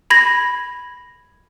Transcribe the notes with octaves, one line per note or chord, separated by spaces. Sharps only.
B5 G#6 A#6